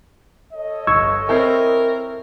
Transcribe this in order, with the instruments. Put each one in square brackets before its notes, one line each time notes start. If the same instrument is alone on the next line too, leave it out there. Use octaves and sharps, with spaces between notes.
[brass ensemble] A4 C#5 D#5
[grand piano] G1 [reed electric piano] C#6 E6 G#6
[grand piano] C4 E4 G#5 [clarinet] A#4